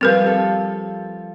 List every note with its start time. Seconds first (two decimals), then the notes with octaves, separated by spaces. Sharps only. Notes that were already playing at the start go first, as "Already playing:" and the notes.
0.01 F3 G3 C4 A#4 B4
0.26 A4